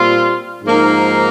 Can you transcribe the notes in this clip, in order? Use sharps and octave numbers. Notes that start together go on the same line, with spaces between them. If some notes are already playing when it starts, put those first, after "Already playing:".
Already playing: A#2 G3 C4 F4
G#2 F3 A#3 D#4